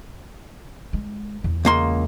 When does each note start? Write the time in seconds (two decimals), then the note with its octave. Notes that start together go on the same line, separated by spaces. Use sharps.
0.93 G#3
1.44 E2
1.65 C#2 A#3 C6